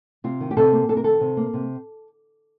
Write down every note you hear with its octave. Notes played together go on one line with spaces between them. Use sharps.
C3 F4
D#3
G4
C3 A4
A#3
C3 A4
A#4
D#3 A4
C3
A#3
C3